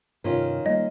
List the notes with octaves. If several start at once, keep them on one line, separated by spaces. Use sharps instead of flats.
G2 C3 D#3 C#4 F4
G3 A#3 D#5